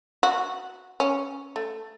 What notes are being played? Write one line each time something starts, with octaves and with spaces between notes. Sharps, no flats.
F#4
C#4
A3